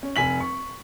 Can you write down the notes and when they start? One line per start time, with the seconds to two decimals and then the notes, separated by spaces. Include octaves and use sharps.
0.03 C#4
0.16 F1 G#5 B6 F#7
0.40 C#6